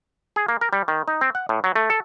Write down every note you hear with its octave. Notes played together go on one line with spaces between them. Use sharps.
G#4
A#3
A#4
G3
D#3
D#4
C4
F#5
A2
F#3
A3
A4